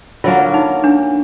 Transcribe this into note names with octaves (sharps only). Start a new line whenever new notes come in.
D3 F#3 A#3 C#4 F4
D#4
D4